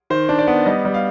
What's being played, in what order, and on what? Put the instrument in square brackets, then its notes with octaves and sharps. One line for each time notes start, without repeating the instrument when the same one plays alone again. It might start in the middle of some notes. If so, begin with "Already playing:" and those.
[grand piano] D#3 C5
D4
D5
B3
G3 D#5
G3
F5